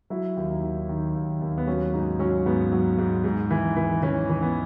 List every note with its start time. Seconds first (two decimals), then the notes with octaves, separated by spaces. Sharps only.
0.10 F#3 E4
0.37 D#2
0.50 D#4
0.63 D#3
0.89 D#3
1.15 D#2
1.41 D#2
1.58 B3
1.67 F#3 C#4
1.94 G#2 D#4
2.19 F#3 C#4
2.46 G#2 B3
2.72 F#3
2.98 G#2
3.24 G#2
3.51 E3
3.77 E3
4.03 E3 C#4
4.29 E3
4.42 B3